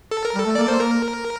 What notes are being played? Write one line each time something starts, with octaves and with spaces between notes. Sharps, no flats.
A4
A#4
G3 A4
A3
A#3 D5
A#3 C5
A#3 A#4